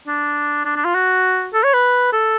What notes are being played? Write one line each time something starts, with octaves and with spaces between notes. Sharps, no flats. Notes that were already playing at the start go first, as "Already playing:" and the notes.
D4
D4
D4
F4
F#4
A4
C#5
B4
A4